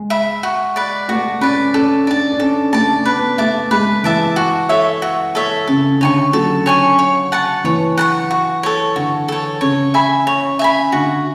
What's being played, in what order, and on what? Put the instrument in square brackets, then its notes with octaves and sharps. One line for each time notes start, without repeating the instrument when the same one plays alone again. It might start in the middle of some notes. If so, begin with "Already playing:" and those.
Already playing: [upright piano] G#3
[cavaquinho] E5 B5
F#4
B4 D5
[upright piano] A3 [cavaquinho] F#4
[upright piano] C#4 [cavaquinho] B4 D5
[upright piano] C#4 [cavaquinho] A4
[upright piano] D4 [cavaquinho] D5 A5
[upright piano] D4
[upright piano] C#4 [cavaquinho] A4
[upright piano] A3 [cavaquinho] D5 A5
[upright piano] B3 [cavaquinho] B4
[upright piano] A3 [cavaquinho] E5 A5 D6
[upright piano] G#3 [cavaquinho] B4
[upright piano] E3 [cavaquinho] E5 A5 D6
[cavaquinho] F#4
A4 C#5 E5
F#4
A4 C#5 E5
[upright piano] C#3 [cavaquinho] A4
[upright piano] D3 [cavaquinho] C#5 G#5 C#6
[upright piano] F#3 [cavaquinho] A4
[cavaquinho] C#5 G#5 C#6
C#5
F#5 A5 C#6
[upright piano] E3 [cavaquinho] C#5
[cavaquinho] F#5 A5 C#6
F#4
A4 C#5
[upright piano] D3 [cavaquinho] F#4
[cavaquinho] A4 C#5
[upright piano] C#3 [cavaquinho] C#5
[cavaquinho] E5 G#5 B5
C#5
E5 G#5 B5
[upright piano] D3 [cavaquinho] F#4